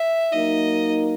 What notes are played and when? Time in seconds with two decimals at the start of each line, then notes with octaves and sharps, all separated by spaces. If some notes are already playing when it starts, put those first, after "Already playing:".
Already playing: E5
0.32 F#3 A#3 D#4 D#5